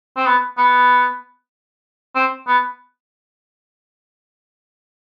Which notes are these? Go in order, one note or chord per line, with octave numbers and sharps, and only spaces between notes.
C4
B3
B3
C4
B3